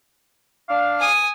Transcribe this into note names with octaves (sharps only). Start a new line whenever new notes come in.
D4 F5
G#5 D#6